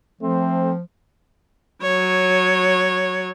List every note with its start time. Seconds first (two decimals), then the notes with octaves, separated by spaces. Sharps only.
0.21 F3 A3 C4
1.82 F#3 C#5